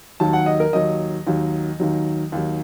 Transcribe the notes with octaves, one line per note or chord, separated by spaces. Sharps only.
D#2 D#3 F#3 A5
F#5
D#5
A#4
D#2 D#3 F#3 D#5
D#2 D#3 F#3
D#2 D#3 F#3
D#2 D#3 F#3